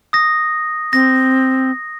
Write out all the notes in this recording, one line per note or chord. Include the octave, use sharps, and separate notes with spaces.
D#6 A#6
C4 A#6